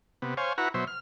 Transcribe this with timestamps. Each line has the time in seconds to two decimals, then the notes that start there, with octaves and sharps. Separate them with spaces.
0.22 C3 B3
0.37 C5 C#5 F5 G#5
0.58 E4 F#4 B4 F#5 A#5
0.74 B2 F#3 C5 E5
0.87 F6